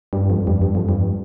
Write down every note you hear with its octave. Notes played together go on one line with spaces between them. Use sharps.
G2
F2
G2
G2
F2
G2